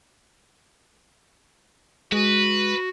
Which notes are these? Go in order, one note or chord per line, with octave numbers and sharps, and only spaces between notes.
G#3 F#4 B4